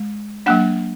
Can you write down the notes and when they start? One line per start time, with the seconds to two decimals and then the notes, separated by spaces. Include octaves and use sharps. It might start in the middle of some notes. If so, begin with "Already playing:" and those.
Already playing: G#3
0.46 F#3 A#3 D4 F#5